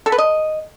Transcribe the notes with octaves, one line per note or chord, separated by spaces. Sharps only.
A4
B4
D#5